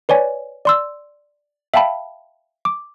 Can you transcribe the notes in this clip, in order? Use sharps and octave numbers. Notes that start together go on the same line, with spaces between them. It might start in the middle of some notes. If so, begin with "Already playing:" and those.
B4 C#5 D5 G#5
D5 C6 E6
E5 F5 G5 A5 B5
D6